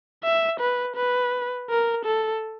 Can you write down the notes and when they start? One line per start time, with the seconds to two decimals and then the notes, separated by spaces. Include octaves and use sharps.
0.24 E5
0.60 B4
0.96 B4
1.69 A#4
2.05 A4